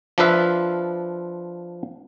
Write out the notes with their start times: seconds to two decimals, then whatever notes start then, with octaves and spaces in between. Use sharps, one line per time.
0.18 F3 D4 F4 B4 E5 F5